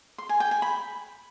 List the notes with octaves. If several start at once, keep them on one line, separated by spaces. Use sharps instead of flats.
C6
G#5
G5
G#5
B5